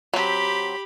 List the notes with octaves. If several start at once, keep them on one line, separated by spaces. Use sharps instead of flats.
F#3 C4 G4 B5